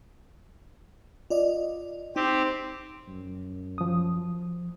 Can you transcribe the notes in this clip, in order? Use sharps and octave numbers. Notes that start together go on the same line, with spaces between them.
F4 D5 D#5
C4 D#4 G4
F#2
F3 D#6